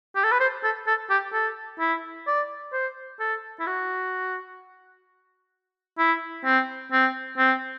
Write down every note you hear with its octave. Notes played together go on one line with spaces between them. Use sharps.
G4
A4
B4
C5
A4
A4
G4
A4
E4
D5
C5
A4
E4
F#4
E4
C4
C4
C4